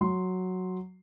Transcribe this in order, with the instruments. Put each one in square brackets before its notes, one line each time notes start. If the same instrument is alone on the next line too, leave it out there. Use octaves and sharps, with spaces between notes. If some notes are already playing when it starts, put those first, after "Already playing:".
[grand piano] F#3 C6